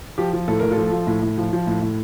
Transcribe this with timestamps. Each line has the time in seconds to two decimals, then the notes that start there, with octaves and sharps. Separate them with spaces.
0.18 F3 G4
0.33 F3
0.48 A2 A4
0.60 A2 A#4
0.71 F4 A4
0.78 F3
0.93 F3
1.07 A2
1.22 A2
1.38 F3
1.53 F3
1.67 A2
1.82 A2